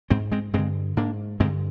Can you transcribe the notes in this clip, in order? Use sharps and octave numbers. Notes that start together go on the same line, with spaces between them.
G#2 G#3 C4
G#3 C4
G2 D3 G#3 C4
G#2 A#3 D4
G2 D3 G#3 C4